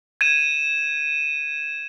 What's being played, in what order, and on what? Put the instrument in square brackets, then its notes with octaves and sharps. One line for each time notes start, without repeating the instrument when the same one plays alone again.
[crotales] G#6 D#7 E7